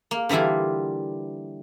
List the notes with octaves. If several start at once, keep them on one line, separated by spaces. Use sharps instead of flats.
A#3
D3 E3 G3 E4 F4